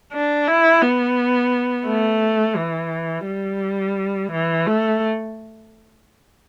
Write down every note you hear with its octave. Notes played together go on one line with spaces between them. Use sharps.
D4
E4
B3
A3
E3
G3
E3
A3